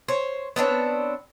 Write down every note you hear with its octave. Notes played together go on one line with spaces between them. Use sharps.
C5 C#5
B3 C4 D4 C#5